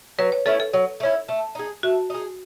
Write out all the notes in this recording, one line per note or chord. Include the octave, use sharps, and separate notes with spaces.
F#3 B4
C#5
A3 C#4 E4 A4
A4
F#3
A3
C#4 E4
A3
D#4 G#4
A3 F#4
D#4 G#4